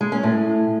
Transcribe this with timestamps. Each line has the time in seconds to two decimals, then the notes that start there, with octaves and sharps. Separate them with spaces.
0.01 G#3
0.12 C#4
0.23 A2